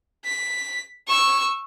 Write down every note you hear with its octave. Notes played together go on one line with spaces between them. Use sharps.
B6
C#6 E6